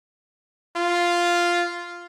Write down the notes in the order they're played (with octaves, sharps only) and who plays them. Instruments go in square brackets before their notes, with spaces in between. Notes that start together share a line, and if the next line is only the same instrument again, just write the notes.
[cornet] F4